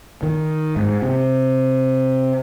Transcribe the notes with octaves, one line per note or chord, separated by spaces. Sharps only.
D#3
G#2
C3